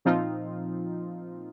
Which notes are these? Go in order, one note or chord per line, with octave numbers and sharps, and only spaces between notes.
A#2 F3 C4 D#4 F4